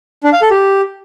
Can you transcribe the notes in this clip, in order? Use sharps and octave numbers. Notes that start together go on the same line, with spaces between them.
D4
F5
A4
G4